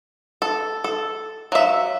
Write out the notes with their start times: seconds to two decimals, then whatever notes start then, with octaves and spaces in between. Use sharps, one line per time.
0.42 A4
0.84 A4
1.52 F#3 E5 F5